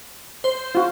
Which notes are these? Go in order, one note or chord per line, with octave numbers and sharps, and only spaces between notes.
C5
F4 F#4